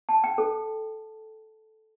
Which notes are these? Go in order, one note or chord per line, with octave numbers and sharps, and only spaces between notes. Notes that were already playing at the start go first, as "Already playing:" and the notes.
A5
G5
A4